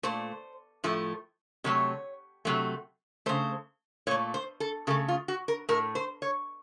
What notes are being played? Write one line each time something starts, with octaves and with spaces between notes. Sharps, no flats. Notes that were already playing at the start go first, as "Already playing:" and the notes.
A#2 A3 C5
A2 F3 A3
C3 F#3 A3 C#5
C3 F#3 A3
C#3 A3 C5
A#2 A3 C#5
C5
A4
C#3 A3 A4
F4
F#4
A#4
A2 A3 A#4
C5
C#5